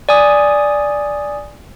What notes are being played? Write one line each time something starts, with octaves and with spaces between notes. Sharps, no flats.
D5 G#5 D#6